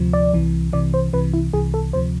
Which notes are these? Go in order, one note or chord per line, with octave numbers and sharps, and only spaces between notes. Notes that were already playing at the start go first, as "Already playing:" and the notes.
Already playing: D2 C3 F3
D5
C2 C3 E3
C2 C3 E3 D5
C5
C2 C3 E3 B4
E4
C2 C3 E3 G#4
A4
D2 C3 F3 C5